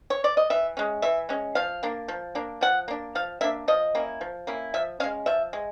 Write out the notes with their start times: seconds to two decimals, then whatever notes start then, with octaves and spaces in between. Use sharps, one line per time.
0.10 C#5
0.24 D5
0.37 D#5
0.50 E3 E5
0.77 G#3 C#4
1.02 E3 E5
1.29 G#3 C#4
1.55 F3 F5
1.83 A#3 D4
2.08 F3
2.35 A#3 D4
2.61 F3 F#5
2.88 A#3 D4
3.15 F3 F5
3.41 A#3 D4 E5
3.68 F3 D#5
3.95 A#3 C#4 E4
4.21 F3
4.47 A#3 C#4 E4
4.74 F3 E5
5.00 C#4 F5
5.04 G#3
5.26 F3 E5
5.53 G#3